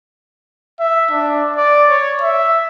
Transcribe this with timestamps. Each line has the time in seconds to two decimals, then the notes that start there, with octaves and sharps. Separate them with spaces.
0.80 E5
1.11 D4
1.56 D5
1.89 C#5
2.22 E5